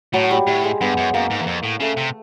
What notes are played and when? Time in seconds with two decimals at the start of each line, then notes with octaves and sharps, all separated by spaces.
0.14 A2 F#3
0.31 G3
0.47 A2 G3
0.64 G#3
0.81 G2 B3
0.97 F#2
1.14 F#2 A#3
1.31 G#2
1.41 E2
1.47 F2
1.64 A2
1.80 C#3 A3
1.97 C3